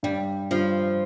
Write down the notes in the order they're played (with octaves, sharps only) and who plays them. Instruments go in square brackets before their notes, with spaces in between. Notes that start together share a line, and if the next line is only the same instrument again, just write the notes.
[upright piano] G2 [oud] G3
[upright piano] G2 [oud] F3